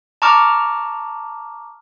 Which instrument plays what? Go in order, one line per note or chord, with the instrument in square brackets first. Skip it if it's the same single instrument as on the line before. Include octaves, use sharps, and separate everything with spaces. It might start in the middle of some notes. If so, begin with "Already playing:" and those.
[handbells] A5 A#5 C#6 D6 F6